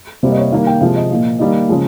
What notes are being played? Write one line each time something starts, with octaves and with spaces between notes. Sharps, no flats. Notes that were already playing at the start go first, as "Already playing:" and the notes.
C3 G3 A#3 C5
D#5
C#5
D#3 G3 A#3 F5
G5
C3 F3 G#3 F5
D#5
A#2 F3 A#3
D#3 G3 A#3 D#5
C#3 F3 G#3